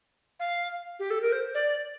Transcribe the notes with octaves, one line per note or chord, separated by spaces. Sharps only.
F5
G4
A4
A#4
C5
D5